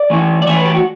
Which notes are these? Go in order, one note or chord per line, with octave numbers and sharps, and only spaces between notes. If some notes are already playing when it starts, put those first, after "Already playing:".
Already playing: D5
E3 A3 E4
D5
E3 A3 E4 E5
B4
G4
F#4